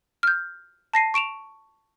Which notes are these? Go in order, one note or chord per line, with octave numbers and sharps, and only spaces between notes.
F6 G6
A5 A#6 C7 D#7
C#6 D7 E7 F7